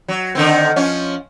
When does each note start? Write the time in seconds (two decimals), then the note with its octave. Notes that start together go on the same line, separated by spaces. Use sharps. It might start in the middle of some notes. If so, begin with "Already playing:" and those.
0.08 F#3
0.35 D3 D#3 C4
0.76 F3 C#4